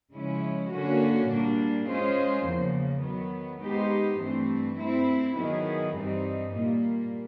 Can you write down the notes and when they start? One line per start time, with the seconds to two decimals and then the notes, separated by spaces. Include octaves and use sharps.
0.12 C#3 F3 G#3 C#4 E4
0.70 D3 F#3 A#3 C#4 F#4
1.29 A#2 G3 A#3 D4
1.87 G#3 C#4 F4 G#4 C5
2.45 E2 C#3 F3 A#3
3.03 D#3 F#3 B3
3.62 G#3 B3 D#4 G4 C5
4.20 G2 E3 A3 C4
4.78 A3 C4 E4
5.36 D#3 F#3 B3 E4 G#4
5.95 G2 E3 G3 C4 D#4
6.52 A#2 G3 A#3